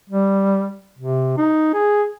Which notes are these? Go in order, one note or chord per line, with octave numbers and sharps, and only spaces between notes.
G3
C3
D#4
G#4